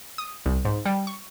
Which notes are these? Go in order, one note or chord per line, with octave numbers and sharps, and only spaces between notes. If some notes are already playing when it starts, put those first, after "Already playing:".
D#6
C2
G#2
G3
C#6